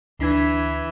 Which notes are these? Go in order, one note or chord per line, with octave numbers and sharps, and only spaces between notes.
D2 E3 D4 G#6